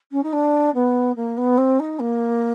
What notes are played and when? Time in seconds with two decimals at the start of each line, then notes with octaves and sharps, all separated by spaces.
0.12 C#4
0.23 D#4
0.32 D4
0.74 B3
1.16 A#3
1.37 B3
1.57 C4
1.79 D#4
1.99 A#3